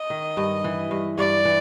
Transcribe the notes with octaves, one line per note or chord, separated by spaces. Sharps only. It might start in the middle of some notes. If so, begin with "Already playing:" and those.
Already playing: D#5
D#3
G2
E3
G2
G2 D5
E3